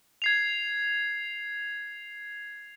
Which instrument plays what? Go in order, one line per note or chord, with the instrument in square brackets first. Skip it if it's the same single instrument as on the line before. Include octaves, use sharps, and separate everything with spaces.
[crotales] G#6 C7 F7